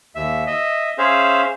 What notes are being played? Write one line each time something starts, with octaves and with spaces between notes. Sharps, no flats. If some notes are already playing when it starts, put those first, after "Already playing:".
D#2 E5
D#5 E5
C#4 G#4 C5 E5 F5